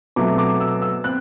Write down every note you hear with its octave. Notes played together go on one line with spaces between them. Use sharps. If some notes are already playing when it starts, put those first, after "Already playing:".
B2 F#3 A3 C4 D6
D6
E6
E6
C4 F#6